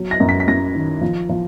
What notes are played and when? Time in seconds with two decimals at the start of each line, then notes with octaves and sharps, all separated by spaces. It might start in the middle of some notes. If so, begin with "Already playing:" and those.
Already playing: F#3
0.11 A#6
0.20 F#2
0.29 B6
0.40 B6
0.48 F#2 A#6
0.75 D#3
1.01 F3
1.29 F3